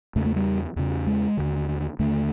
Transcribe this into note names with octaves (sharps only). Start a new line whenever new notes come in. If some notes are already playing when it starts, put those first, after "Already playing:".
E2 C#3 A3
A3
G3
E2 C#3
G#3
D#2 D3
D#2 D3 A3